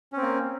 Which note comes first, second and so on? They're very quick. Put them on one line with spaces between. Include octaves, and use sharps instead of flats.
C#4 C4 A#3